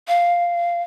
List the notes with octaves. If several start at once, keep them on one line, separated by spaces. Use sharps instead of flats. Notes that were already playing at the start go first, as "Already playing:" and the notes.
F5